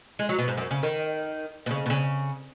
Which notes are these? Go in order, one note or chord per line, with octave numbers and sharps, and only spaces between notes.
G#3
F#3
B2
G#2
F#2
C#3
D#3
B2
C#3
B2
C#3